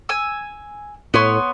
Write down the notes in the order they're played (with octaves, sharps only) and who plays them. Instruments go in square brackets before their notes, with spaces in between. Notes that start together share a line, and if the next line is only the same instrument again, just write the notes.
[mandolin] G#5 E6
[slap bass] A2 [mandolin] B3 C#5 C6